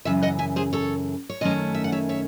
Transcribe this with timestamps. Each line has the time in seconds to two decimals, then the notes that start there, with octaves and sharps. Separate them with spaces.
0.05 F#2 C#3 E3 E5
0.23 D#5 F#5
0.39 E5 G#5
0.56 G#4 C5
0.73 A4 C#5
1.29 C#5
1.41 F#2 D#3 A3 C#4 C5 D#5
1.74 E5
1.84 F#5
1.92 C#5 E5
2.09 C#5 E5